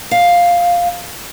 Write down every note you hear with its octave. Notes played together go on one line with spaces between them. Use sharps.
F5